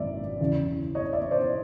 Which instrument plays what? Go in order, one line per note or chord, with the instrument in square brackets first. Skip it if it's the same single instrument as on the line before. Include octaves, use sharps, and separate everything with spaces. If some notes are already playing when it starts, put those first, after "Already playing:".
Already playing: [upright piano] G#1 F#2 D5 E5
E2 C#3 E3
C#5 D#5
D5 E5
C5 D5